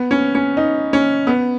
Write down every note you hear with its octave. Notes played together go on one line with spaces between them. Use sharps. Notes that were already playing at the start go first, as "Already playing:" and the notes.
Already playing: B3
C#4
C#4
D#4
C#4
B3